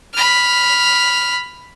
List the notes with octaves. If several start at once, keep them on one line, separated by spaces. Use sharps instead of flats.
B5 F6